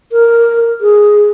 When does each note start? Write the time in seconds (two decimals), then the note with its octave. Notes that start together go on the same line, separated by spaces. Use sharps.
0.12 A#4
0.81 G#4